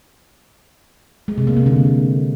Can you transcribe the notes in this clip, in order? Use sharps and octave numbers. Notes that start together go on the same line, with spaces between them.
G#3
C3
A#3
C3
D3